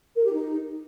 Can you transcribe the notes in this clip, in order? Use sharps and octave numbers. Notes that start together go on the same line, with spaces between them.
A#4
G4
D#4